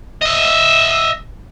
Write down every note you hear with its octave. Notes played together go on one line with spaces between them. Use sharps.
D#5 E5